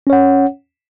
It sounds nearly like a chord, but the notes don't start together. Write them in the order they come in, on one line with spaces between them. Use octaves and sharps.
C#4 C#5 F#5